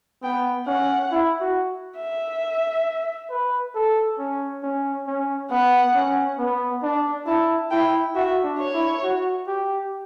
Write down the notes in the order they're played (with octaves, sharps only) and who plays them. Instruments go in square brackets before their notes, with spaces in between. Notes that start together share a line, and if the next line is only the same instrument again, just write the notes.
[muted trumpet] B3 [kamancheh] G5
[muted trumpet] C#4 [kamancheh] F#5
[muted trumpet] E4
F#4
[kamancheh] E5
[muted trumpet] B4
A4
C#4
C#4
C#4
[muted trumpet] B3 [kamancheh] F#5
[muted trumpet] C#4
B3
D4
[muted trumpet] E4 [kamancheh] A5
[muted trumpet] E4 [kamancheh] G5
[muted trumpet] F#4 [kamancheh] E5
[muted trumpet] D4
[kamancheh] C#5
[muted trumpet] E4
F#4
G4